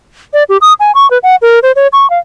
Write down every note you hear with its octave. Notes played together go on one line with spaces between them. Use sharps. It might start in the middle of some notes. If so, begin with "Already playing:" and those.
D5
G4
D#6
G#5
C#6
B4
F#5
A#4
C5
C#5
C#6
F5